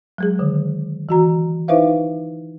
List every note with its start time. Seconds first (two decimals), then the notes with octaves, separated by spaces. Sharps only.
0.18 F#3 G#3 G#4
0.39 D3 D#3
1.09 E3 F#4 A#5
1.68 D#4 E4 B4 C5 E5 F5